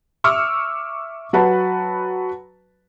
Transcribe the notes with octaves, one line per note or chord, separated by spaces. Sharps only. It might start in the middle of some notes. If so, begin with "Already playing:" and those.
E5 C#6 D6 E6 F6
F#3 F#4 B4 A5 B5